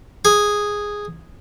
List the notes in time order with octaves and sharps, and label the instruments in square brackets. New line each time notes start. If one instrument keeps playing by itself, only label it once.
[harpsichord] G#4